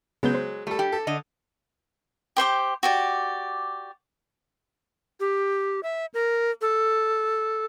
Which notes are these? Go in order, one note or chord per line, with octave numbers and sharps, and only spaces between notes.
C#3 F#3 G#3 B3 G6
C5
G3 A3 A4
G4
A4
D3 D#5
G4 C5 G5 D6
F#4 G4 D5
G4
E5
A#4
A4